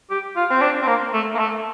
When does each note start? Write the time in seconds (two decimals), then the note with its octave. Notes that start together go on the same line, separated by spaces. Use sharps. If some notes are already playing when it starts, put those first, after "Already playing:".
0.11 G4
0.36 F4
0.50 C4
0.62 D4
0.82 C4
0.87 A#3
1.13 A3
1.34 A#3
1.39 A3